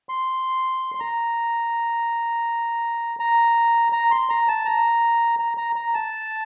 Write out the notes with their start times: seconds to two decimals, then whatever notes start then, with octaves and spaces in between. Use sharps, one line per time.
0.09 C6
0.95 C6
1.00 A#5
3.20 A#5
3.93 A#5
4.11 C6
4.29 A#5
4.48 A5
4.65 A#5
5.39 A#5
5.57 A#5
5.76 A#5
5.94 A5